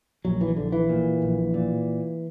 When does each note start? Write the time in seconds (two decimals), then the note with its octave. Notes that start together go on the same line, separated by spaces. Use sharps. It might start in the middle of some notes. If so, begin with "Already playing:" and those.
0.25 A#1 F#3
0.41 E3
0.56 A#1 D3
0.72 E3
0.89 A#2
1.22 A#1
1.54 A#2